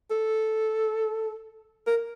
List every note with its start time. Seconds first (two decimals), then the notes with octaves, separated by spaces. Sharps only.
0.10 A4
1.87 A#4